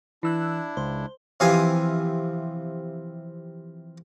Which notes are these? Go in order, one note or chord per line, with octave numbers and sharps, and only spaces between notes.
E3 D4 E4 E6 F#6
C#2 C5
C3 E3 F3 F5 G#5 D#6